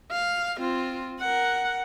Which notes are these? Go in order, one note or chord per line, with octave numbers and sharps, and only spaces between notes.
F5
C4 F4
A#4 F#5